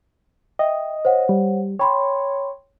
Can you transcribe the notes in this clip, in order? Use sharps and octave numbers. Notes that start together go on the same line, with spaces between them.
D#5 E5 G5
C5 C#5 F#5
G3
C#5 G5 B5 C6